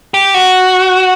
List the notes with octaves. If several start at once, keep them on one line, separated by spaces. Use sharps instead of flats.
G4
F#4